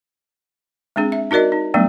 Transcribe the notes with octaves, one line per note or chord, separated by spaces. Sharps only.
G#3 C4 D4 G#4
E5
D#4 F#4 A#4 D5 D#5
D#4
F#3 G3 A3 B3 D4